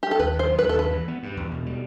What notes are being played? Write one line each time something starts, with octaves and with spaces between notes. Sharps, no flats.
G4
A4
D#2 B4
D#3
C5
F#3
B4
D#2
A4
G2 B4
E3
B3
G2
E2
B2
G3